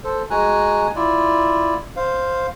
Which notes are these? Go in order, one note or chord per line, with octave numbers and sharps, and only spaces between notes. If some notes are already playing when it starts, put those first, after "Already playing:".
A4 C5
G#3 F#4 G#5 A#5 F#6
E4 F4 D5
C5 F5